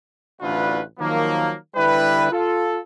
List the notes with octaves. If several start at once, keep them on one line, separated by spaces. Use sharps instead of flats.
A1 D2 D4 E4 F4 B4
D#3 F3 F#3 A#3
D3 G3 E4 G4 B4
F4 A4